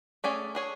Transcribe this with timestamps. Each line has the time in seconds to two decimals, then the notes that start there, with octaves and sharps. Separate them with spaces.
0.24 A3 C#4 G#4 D5
0.55 D4 G#4 C#5